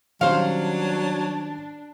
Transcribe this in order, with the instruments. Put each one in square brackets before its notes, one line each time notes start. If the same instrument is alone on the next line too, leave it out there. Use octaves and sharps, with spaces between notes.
[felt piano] D#3 G3 C#4 [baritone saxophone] F#3 [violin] D4 [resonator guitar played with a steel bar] C5 F5